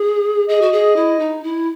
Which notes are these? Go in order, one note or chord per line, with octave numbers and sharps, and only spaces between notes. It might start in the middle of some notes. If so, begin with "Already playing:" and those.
Already playing: G#4
G#4 D#5
F#4
G#4
E4
D#4
E4